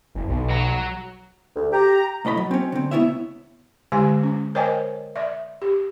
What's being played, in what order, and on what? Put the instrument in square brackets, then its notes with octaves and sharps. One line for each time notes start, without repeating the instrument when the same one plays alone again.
[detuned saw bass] F#1
B1
[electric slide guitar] F#3 F#5 A#5
[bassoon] D2
[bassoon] G4 [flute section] A#5
[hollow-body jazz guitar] B1 A2 D#5 B5
F#3
C4 C#4
D3 C4
C#2 B3 E4 C#5 E5
[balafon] D3 G#3 G4 G#5
C#4
A#4 C5 C#5 D#5 G5 G#5
D5 E5
G4